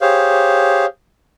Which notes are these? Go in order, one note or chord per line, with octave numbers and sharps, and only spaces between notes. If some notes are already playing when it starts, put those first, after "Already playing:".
G4 G#4 C5 C#5 F5